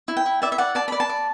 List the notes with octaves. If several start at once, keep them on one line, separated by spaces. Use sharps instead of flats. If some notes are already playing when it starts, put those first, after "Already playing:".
E4
G5
E4
D5 E5
E5
D5 F#5
D5 A5
D5 B5
A5
D5